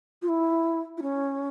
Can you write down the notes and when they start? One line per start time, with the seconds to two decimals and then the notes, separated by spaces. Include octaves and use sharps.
0.22 F4
0.28 E4
0.97 E4
1.02 C#4